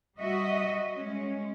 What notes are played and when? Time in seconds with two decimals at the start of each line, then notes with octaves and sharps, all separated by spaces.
0.18 G3 F#4 D#5 E5
0.95 G#3 C#4